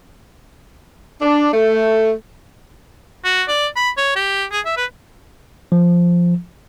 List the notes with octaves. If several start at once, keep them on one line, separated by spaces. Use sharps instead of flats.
D4
A3
F#4
D5
B5
C#5
G4
G#4
E5
B4
F3